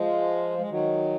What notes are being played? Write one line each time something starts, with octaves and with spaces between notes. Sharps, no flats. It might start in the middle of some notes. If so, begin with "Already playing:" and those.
Already playing: F3 G#3
G#3
D#3 F#3